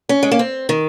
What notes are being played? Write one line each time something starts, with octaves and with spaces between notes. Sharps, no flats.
C#4
G#3
A#3
C4
D#3